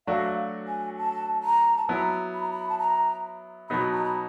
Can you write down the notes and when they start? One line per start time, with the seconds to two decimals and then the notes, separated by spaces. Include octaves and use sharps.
0.07 F#3 A3 D4 F#4 F5
0.68 G#5
0.98 A5
1.43 A#5
1.77 A5
1.88 F#3 B3 E4 A#5
2.34 B5
2.43 A#5
2.51 B5
2.69 A5
2.79 A#5
3.70 B2 F#3 B3 D#4 B5
3.93 A#5
4.05 B5